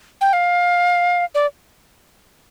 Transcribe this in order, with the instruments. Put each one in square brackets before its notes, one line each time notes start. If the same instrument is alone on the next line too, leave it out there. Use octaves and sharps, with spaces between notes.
[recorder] G5
F5
D5